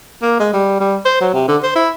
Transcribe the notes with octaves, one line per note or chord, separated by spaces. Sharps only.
A#3
G#3
G3
G3
C5
F#3
C3
D3
C5
E4